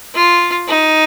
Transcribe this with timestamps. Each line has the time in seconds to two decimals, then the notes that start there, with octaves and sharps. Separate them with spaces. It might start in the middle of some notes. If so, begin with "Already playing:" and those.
0.15 F4
0.68 D#4